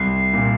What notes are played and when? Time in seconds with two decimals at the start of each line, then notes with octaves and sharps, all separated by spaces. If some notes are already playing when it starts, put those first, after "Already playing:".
Already playing: C2 C7
0.34 A#2